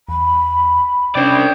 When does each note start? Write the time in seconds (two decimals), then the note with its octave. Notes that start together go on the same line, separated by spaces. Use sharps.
0.09 E2 B5
1.15 C3 C#4 D4 C5 D5 G5